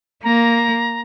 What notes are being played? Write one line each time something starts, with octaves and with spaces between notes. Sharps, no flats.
A#3 A#5